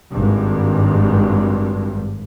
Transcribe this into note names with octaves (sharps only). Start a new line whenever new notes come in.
G#1 G2